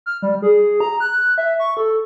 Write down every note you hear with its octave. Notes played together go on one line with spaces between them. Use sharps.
F6
G3
G#4
A#5
F#6
E5
C#6
A4